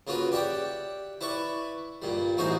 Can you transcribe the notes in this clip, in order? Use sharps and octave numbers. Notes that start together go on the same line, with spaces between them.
C#3 A#3 F4 F#4 B4
G4 D5 E5 F#5 G5
E4 B4 D5 C#6
G2 A#2 G3
A1 E2 D#4 F#4 G#4 C5